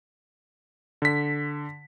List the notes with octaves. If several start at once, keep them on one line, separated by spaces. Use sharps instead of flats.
D3 B6